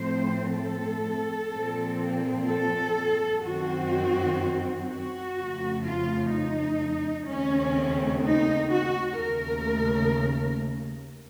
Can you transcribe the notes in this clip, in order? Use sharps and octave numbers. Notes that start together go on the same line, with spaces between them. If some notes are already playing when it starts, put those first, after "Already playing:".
Already playing: A2 F3 A3 C4 C5
A4
A#2 F3 C4
A4
F#2 D#3 F#3 C4 F#4
F#4
F2 C#3 F3 A3
F4
D#4
D#2 C#3 A3 C4 C#4
D#4
F#4
D#2 C#3 A3 A#4